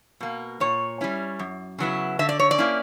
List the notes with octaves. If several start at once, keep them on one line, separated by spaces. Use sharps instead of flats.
B2 A#3
A#2 C#5
G3 C#4 E4
F#2
C#3 F#3 B3 E4
D3 E5
D5
C#5
D5
A#3 C#4 E4